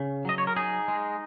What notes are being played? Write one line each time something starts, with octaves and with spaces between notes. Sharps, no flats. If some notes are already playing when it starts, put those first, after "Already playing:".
Already playing: C#3
F#3 D#5
C#5
A#4
D#4 G#4
G#3